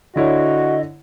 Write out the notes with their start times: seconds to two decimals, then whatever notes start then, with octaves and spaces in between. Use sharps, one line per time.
0.16 D3 E4 F#4 C#5 D#5